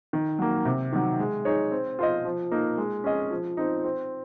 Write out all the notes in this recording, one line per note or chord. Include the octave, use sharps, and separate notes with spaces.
D#3
F#3 A#3
C3
D#3 F#3
G#3
D#4 G#4 C#5
C4
F4 C5 D#5
F3
A#3 D#4 A#4
G#3
C#4 G#4 D#5
F3
C4 D#4
C4